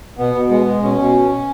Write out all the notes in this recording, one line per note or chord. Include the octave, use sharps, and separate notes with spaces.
B2 B3
B2
G#3 B3
G#3
B2 C#4
B2